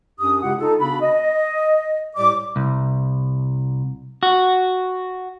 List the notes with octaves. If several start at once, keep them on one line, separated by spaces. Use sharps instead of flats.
F#2 C#4 D4 G4 D#6
C#3 G#3 E4 F4 G4 F#5
D#4 F4 A4
C#3 B3 D4 F#4 B5
D#5
A2 G3 G4 D5 D6
C2
F#4